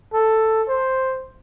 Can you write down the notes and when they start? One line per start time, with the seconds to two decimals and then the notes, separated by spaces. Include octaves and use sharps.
0.13 A4
0.69 C5